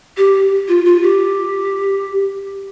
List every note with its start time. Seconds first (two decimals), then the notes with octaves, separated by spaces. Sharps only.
0.17 G4
0.69 F4
0.86 F4
1.03 G4